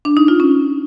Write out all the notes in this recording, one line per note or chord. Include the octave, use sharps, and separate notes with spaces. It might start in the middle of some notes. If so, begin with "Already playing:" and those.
D4
D#4
F4
C#4